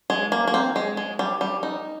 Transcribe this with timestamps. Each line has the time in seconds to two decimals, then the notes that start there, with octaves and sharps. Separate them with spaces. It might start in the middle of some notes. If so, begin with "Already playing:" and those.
0.10 G#3
0.32 A#3
0.47 A#3
0.54 C4
0.76 G#3
0.97 G#3
1.19 G3
1.41 G3
1.63 D#4